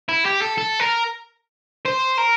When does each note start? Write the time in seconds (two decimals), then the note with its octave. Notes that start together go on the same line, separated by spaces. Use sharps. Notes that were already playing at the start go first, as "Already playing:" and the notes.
0.09 E4
0.26 G4
0.42 A4
0.58 A4
0.80 A#4
1.86 C5
2.18 A#4